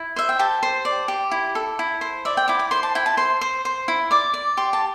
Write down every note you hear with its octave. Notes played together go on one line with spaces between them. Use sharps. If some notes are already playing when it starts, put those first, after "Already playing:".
Already playing: E4
C5 E5
G5
G4 A5
C5
D5
G4
E4
A4
E4
C5
D5 E5
G5
E4 D6
D6
C5 C6
A5
E4 G5
A5
C5 C6
C5
C5
E4
D5 D6
D5
G4 C6
A5